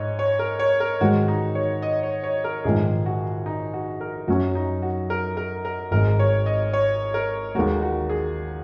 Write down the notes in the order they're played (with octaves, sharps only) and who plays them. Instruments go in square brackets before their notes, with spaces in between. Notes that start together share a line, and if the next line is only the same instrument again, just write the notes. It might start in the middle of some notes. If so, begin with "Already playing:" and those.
Already playing: [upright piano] G#2 [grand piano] C#5 D#5
[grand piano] C#5
A#4
C#5
A#4
[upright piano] G#2 D#3 G#3 [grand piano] F#4
[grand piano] D#4
C#5
D#5
C#5
C#5
A#4
[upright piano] A#1 G#2 D#3 [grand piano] G#4
[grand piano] F#4
D#4
F#4
A#4
[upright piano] F#2 F#3 C#4 [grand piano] F#4
[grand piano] D#4
F#4
A#4
A#4
A#4
[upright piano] G#1 G#2 G#3 [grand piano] A#4
[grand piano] C#5
D#5
C#5
A#4
[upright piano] D#2 D#3 G#3 D#4 [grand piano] F#4
[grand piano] F#4
G#4